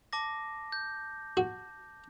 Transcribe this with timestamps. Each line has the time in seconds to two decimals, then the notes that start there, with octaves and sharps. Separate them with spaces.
0.13 A5 D6 A#6
0.72 G6
1.37 F#4